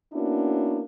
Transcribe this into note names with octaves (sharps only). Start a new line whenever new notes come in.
A#3 B3 C#4 D4 E4 F#4